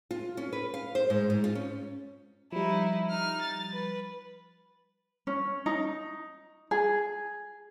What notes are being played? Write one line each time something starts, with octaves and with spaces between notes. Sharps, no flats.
F4
C#4
B4
F5
C5
G#2
G#2
F4
C#4
F3 G3 D#4 E4
D#4 F6
A6
B4
C#4
D#4
G#4